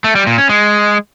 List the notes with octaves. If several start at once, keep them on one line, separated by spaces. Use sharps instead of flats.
A3
G3
A#2
C#4
G#3